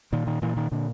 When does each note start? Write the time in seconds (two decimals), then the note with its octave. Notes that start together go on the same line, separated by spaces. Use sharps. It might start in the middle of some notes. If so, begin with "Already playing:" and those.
0.13 A#2 D#3
0.27 D#3
0.42 A#2 E3
0.57 D#3
0.72 A#2 D3